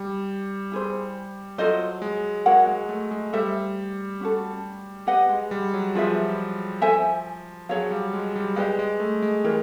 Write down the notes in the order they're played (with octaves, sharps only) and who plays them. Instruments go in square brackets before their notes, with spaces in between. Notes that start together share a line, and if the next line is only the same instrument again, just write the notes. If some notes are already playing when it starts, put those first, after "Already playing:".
Already playing: [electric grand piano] G3
[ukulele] E4 G#4 C5
[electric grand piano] F#3 [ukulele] F4 A4 C5 D#5
[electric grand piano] G#3
[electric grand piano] G#3 [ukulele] F#4 A#4 C#5 F#5
[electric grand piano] G#3
A3
G#3
[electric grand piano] G3 [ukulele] A4 C5 E5
[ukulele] C#4 F#4 A4
G4 B4 D#5 F#5
[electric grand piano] G#3
G3
F#3
[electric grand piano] F3 [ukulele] F4 G#4 B4 E5
[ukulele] A4 C5 E5 G#5
[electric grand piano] F#3 [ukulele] G#4 C#5 F5
[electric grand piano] G3
G#3
G3
[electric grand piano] G#3 [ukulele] G4 B4 D5 F5
[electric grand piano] G#3
A3
G#3
[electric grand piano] E3 [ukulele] G4 A#4 C#5